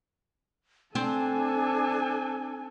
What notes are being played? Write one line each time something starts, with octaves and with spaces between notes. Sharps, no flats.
C4 D4 A4 G#5